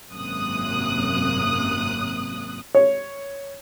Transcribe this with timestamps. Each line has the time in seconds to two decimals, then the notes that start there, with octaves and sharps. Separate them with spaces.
0.11 G#1 F#2 C3 A#3 D#6 F#6
2.75 C#5